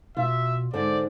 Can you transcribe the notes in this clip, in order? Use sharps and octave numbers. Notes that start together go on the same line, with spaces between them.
B2 F4 E5
G#2 D3 C5 D5